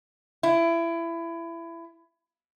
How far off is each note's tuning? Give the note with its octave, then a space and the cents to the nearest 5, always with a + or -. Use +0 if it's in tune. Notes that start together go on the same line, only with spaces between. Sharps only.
E4 +25